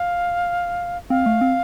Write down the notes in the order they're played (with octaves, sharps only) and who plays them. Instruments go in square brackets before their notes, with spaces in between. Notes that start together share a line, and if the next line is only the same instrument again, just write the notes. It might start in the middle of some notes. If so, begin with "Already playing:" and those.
Already playing: [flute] F5
[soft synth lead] C4 [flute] F5
[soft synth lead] A3
C4